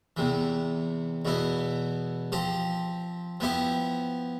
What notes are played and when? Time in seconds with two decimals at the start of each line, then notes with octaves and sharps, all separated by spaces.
0.17 E2 C3 E3
1.25 E2 B2 B3 E4
2.32 F3 C4 G4
3.40 F3 B3 E4 G4